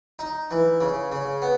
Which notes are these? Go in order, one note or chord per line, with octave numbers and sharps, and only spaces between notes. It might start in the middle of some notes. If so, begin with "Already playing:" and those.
D#4
E3
C#3
C#3
B3